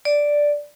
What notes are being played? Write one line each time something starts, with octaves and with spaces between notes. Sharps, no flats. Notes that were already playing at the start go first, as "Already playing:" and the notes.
D5